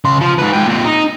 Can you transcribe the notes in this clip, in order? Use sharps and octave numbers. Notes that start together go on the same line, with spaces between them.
C#3 C6
F3
G#2 B4
G#2 G5
A#2 C4
D#4